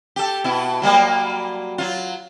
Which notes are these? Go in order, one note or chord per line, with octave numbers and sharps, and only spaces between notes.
G4 A4
B2 E4
F#3 G3 A#3
F#3 F4